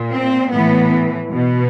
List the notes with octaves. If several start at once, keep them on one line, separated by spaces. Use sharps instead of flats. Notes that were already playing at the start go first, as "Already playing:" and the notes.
Already playing: A#2
C4
A2 E3 B3
B2